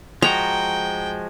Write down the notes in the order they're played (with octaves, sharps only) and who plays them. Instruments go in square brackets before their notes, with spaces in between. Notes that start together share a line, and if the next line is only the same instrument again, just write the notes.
[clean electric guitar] F3 G#3 F#4 [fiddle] G5 [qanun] A#5